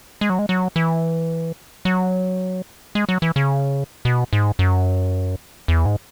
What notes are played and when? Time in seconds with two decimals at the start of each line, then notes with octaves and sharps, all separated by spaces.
0.21 G#3
0.30 F#3
0.39 G#3
0.49 F#3
0.76 E3
1.85 F#3
2.95 G#3
3.09 F#3
3.22 E3
3.36 C#3
4.05 B2
4.33 G#2
4.59 F#2
5.68 E2
5.86 G#2